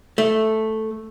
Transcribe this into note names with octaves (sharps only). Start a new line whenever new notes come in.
A3